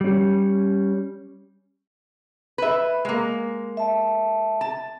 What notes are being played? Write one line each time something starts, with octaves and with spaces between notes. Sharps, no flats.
G3 C#4
B4 E5
G#3 A#3
E5 A5
A5